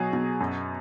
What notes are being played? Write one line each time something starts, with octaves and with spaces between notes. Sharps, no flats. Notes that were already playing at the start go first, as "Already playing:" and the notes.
Already playing: B2 F#3 G#4
B2
F#2